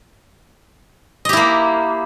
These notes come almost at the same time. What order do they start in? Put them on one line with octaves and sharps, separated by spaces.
D#5 G4 E4 A#3